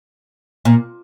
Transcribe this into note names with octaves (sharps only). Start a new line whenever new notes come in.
A#2